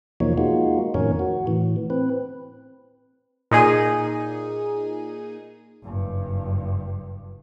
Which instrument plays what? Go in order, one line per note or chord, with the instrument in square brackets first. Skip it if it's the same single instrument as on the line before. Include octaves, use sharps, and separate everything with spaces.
[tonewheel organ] E2 B2 F3 A#3 D#4 C#5
G#3 A#3 D#4 F4 F#4
F2 A2 D#3 C#4 A#4 C#5
F#4
A2 E3
C4 B4
[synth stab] A#2 D#4 G#4 D#7
[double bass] F#1 G2